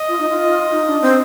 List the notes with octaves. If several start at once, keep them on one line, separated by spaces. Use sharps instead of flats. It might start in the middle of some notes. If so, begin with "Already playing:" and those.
Already playing: D#5
F4
D#4
F4
D#5
D#4
D4
C4